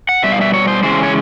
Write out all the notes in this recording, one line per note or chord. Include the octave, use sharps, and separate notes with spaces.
F#5
B2 G3 E5
F5
E5
C#5
C5
C#3 E3 G#3 C#4 C5
C#5